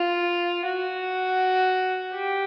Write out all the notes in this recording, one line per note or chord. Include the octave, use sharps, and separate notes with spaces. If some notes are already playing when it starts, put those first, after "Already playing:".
Already playing: F4
F#4
G4